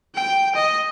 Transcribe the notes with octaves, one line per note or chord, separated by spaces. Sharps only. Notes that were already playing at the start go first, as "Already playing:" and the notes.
G5
D#5